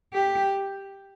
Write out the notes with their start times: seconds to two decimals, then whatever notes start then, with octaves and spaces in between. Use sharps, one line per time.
0.13 G4